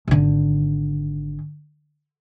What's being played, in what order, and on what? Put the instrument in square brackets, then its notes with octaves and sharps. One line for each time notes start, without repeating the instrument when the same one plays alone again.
[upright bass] G#1 D3